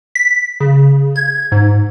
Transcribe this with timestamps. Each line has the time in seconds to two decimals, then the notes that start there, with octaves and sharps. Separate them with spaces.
0.15 B6
0.60 C#3
1.16 G#6
1.52 G#2